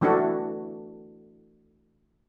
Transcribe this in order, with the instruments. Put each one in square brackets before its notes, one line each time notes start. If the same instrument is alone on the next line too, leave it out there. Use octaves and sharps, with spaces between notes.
[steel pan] E3 A3 D4 E4 F#4